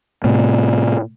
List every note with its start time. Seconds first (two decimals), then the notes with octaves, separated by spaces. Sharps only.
0.24 A2 C3